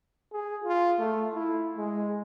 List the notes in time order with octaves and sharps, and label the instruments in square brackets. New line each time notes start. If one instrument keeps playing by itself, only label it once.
[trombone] G#4
F4
A3
E4
G#3